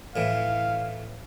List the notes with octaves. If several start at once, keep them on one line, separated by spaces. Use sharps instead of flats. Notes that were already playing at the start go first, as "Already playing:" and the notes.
A2 E3 F5